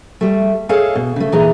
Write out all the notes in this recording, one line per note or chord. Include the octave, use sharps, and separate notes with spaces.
G3 A3
G#4 A4 C#5 D#5 F5 G#5
B2
C#3 A3
A#2 E3 D#4 G#4 D#5 A#5